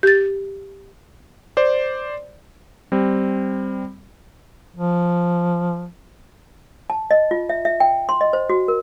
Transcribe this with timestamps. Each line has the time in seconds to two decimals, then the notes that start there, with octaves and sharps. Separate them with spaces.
0.03 G4 A6
1.57 C5 D5
2.92 G3 C4
4.76 F3
6.90 A5
7.11 D#5
7.31 F4
7.49 E5
7.65 E5
7.80 G5
8.09 C6
8.21 D#5
8.33 C5
8.50 F#4
8.68 A#4